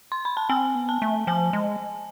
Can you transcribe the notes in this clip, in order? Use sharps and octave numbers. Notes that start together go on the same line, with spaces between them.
C6
B5
A5
C4 G#5
B3
A5
A3
F3 G#5
G#3